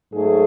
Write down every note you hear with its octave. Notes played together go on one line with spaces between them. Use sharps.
G#2 F#3 A3 G#4